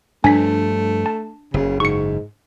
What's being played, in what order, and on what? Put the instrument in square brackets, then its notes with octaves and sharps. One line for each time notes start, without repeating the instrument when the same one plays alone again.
[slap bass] G2 F3 [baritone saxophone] A3 [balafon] D4 [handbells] G#5 B6
[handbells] A5
[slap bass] F#1 [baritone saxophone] C#3
[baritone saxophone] G#2 [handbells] C#6 C#7